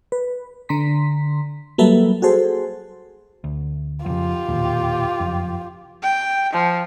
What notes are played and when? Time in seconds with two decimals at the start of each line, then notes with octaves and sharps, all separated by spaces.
0.12 B4
0.69 D3 A#5 C6 B6
1.78 F#3 G3 A#3 A4 B4 E5
2.22 F#4 G#4 A4 C5
3.44 D2
4.06 F2 C#3 F4 G4
4.49 E1 D#2 A#2
5.20 F#1 F2
6.03 G5
6.53 F3